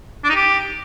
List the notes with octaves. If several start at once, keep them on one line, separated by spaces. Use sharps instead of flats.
D4
D#4
G4